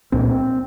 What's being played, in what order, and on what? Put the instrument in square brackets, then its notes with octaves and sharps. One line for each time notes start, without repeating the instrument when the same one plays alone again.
[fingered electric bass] C2 A#2 C4